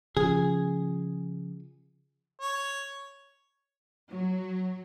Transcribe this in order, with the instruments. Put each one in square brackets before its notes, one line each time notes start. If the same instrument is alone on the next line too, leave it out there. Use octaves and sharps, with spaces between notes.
[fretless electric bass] C#3 F3 [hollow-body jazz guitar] G#4
[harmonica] C#5
[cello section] F#3